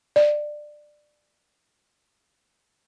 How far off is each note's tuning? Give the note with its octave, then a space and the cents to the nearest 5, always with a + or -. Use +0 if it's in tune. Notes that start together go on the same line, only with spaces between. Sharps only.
D5 +20